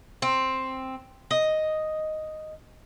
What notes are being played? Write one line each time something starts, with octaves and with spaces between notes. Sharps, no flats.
C4
D#5